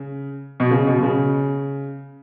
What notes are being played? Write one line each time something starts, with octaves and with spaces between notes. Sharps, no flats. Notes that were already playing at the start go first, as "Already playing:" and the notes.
Already playing: C#3
B2
C#3
B2
B2
C#3